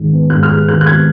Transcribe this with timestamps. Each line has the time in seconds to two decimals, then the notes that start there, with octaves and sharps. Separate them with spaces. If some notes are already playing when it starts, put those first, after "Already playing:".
Already playing: G#2 D#3 G#3
0.12 B3
0.30 G#2 F#6
0.43 F6
0.49 G#3 F#6
0.68 D#3 F#6
0.81 F#6
0.86 B3 G#6